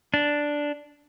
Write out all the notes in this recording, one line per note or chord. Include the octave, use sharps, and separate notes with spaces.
D4